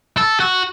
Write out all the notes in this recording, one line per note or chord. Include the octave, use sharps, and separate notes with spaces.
A4
F#4